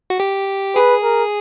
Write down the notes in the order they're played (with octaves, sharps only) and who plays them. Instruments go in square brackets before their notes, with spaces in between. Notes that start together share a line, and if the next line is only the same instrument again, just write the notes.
[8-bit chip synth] F#4
G4
[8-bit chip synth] G#4 [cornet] B4
[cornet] A#4